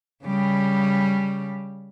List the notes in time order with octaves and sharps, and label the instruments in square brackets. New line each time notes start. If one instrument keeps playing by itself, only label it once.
[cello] C#3 G3